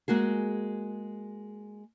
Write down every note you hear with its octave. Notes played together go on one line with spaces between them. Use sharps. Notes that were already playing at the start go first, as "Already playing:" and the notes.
G#3 A#3 F#4 G#4